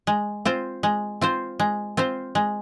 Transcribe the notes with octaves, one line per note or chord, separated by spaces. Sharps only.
G#3
C4 F4 C5
G#3
C4 F4 C5
G#3
C4 F4 C5
G#3